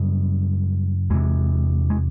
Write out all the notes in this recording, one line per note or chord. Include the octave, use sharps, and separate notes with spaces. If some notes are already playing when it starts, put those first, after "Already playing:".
Already playing: F#2 C#3 G3
E2 C3 G#3
G#3